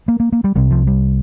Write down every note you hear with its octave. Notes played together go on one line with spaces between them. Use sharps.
A#3
A#3
A#3
G3
C2 C3 G3
F3
G3